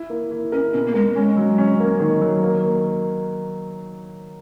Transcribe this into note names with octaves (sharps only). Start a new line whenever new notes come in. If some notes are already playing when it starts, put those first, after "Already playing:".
Already playing: E4
A#3
E4
C#4 A#4
B2 C#4
A#3
G#3 A#4
G#3 C#4
F#3
C#4
A#3
D#3
F#3
A#3
A#3